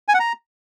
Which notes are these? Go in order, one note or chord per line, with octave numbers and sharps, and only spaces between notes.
G#5
F#5
A#5